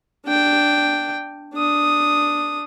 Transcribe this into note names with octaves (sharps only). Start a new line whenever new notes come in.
D4 G5
D4 D#6